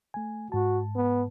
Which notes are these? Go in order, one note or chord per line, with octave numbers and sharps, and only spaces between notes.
A3 G#5
G#2 F#4 A5
B3